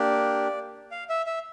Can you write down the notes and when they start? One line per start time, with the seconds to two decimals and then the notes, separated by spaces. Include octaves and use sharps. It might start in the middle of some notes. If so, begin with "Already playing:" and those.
Already playing: A#3 D4 G4 D5
0.91 F5
1.10 E5
1.26 E5